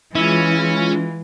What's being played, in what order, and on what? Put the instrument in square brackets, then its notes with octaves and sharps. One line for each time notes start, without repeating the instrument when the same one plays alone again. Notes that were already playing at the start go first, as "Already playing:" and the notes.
[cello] E3 [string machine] G#3 F4 [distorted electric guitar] C#4 [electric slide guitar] E4